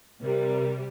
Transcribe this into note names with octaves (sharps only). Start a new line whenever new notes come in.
C3 G3 A#4